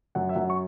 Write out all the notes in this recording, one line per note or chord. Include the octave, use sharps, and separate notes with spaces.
F#2 F#5
E5
F#2 F#5
C#6